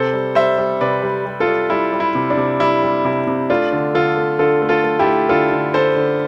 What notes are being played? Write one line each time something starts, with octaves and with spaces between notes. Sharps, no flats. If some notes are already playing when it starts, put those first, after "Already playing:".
Already playing: C3 A4 C5
G3
G3 C5 E5
G3
C3 B4 D5
G3
G3
F4 A4
G3
G3 E4
G3
E4
C3
D4
C3
G3 E4
G3
C3 E4
C3
A3 D4 F4
D3
D3 F4 A4
A3
D3 F4 A4
A3
F4 A4
A3
E4 G4
A3
D3 F4 A4
D3
D3 A4 C5
D3